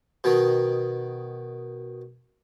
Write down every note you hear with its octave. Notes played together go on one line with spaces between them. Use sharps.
B2 D#3